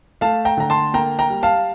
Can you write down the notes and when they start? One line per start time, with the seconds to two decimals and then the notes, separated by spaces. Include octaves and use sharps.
0.21 A3 F5 A5
0.45 G5 A#5
0.57 D3 A#5
0.70 A5 C6
0.94 A#3 G5 A#5
1.19 G5 A#5
1.30 G3
1.43 F5 A5